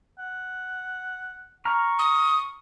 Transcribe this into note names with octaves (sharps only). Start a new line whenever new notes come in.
F#5
A#5 C#6 F6
D#6